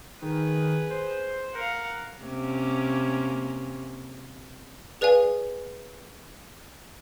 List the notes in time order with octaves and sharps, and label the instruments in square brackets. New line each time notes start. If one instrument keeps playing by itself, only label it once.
[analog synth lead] D#3 [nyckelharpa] G#4 B4
[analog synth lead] C5
[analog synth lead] A#4 [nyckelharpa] F5 F#5
[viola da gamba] C3 A#3 C#4
[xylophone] G#4 B4 D5 F5 G#5